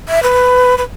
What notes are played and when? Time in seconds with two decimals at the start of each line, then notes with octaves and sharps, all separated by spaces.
0.09 E5
0.23 B4
0.78 B4